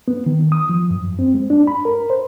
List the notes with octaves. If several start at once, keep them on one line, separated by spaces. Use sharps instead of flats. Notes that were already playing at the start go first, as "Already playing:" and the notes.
B3
D#3
D#6
F3
F#2
C4
G#3
D4
B5
A#4
C5